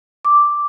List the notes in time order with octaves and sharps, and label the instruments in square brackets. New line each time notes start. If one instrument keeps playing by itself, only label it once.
[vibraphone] D6